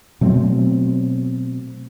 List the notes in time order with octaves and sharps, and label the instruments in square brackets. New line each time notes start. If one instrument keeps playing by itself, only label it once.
[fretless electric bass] B2 F#3 A3 C4